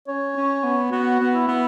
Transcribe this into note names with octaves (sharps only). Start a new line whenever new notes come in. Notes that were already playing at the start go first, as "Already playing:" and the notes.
C#4 C#5
C#4
B3
B3 F#4
B3
E4
B3